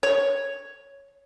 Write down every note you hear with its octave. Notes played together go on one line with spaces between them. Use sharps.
C#5